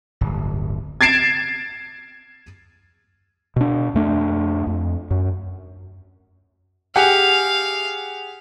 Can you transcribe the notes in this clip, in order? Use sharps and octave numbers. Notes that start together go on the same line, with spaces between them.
D1 G1
G#6 A6 C7 D7 E7
B2 D4
F2 A3 D4
F2
F#2
G4 G#4 F5 F#5